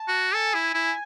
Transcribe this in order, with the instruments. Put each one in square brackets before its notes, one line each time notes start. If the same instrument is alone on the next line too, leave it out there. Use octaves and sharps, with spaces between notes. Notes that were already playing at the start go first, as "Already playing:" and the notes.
Already playing: [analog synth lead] A5
[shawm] F#4
[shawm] A4 [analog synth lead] G#5
[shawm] E4
E4